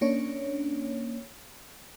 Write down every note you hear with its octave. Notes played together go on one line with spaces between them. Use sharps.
A#3 C#4 D4 C#5